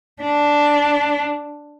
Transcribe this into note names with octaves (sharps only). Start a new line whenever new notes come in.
D4